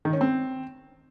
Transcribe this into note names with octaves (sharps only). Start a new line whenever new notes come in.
D#3
C#4
C4